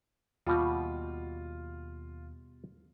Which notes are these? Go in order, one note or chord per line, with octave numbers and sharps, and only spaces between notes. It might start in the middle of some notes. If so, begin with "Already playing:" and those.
D#2 B2 G3 F4 F#4